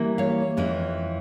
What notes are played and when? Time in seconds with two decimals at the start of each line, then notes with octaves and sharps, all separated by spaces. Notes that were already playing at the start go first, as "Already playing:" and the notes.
Already playing: E3 G3 A#3 E4
0.18 C#5 F5
0.57 F2 E3 G#3